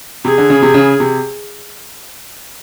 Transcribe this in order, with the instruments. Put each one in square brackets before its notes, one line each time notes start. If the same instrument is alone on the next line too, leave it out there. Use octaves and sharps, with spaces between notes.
[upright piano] C3 [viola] G#4
[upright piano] D3
C#3
C3
C#3
C3